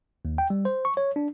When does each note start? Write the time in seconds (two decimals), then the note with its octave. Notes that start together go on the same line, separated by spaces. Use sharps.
0.25 D#2
0.38 G5
0.50 G3
0.65 C5
0.85 C#6
0.97 C#5
1.16 D4